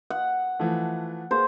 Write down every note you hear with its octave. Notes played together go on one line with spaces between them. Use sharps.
F#5
E3 F3 A3
A#3 G#4 C5